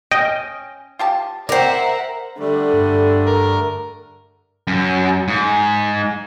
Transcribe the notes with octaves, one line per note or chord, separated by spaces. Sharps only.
C#4 D#5 G5
F4 G4 A5
A#4 C5 D5 E5 F#5 G5 A#5
D3 G3 A3
G2
A#4
F#2
G#2